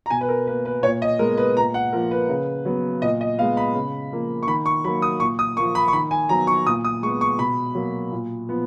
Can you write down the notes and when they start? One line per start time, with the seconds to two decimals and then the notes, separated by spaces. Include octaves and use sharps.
0.06 A#5
0.10 B2 G#5
0.21 B4
0.29 A#4
0.47 A#3 B4
0.65 B4
0.83 A#2 C#5
1.02 D#5
1.19 G#3 B3 A#4
1.37 B4
1.57 A#2 A#5
1.74 F#5
1.93 F3 A#3 A#4
2.11 B4
2.29 C#3
2.65 F#3 B3
3.02 A#2 D#5
3.21 D#5
3.38 B3 F5
3.42 G#3
3.57 B5
3.74 C#3
4.12 F3 A#3
4.43 C#6
4.47 D#3 B5
4.66 C#6
4.84 F#3 A#3 B5
5.02 D#6
5.20 A#2 C#6
5.39 D#6
5.57 F3 A#3 C#6
5.75 B5
5.88 C#6
5.93 D#3 B5
6.11 G#5
6.29 F#3 B3 A#5
6.47 C#6
6.66 A#2 D#6
6.84 D#6
7.02 G#3 C#6
7.06 B3
7.21 C#6
7.39 B2 B5
7.75 F#3 A#3
8.11 A#2
8.49 F3 B3